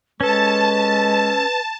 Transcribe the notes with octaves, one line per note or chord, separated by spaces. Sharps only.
G#3 C#4 A4 B4 A5